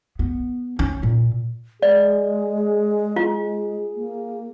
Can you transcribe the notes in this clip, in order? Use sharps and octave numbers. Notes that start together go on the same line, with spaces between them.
B3
C#4
A#2
G#3 G#4 D5
F4
A#3